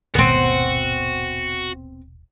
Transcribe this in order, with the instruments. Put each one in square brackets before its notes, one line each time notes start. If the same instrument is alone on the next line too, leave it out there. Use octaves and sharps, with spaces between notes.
[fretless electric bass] D#1 G#1 B2 [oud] B3 C4 [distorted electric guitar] F#4